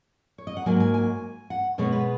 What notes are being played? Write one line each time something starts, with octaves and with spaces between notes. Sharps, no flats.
C#5
D#5
F#5
G#2 F#3 A#3 G#5
G#5
G#5
F#5
B2 G#3 B3 C#5
B4